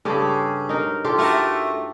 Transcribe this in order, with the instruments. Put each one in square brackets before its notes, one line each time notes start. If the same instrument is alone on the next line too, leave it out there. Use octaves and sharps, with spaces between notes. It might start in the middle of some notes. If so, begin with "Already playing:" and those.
[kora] G2 G4 A4 [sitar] C#3
[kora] D#4 A#4
F4 G4 A4
[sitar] A3 F#4 A#4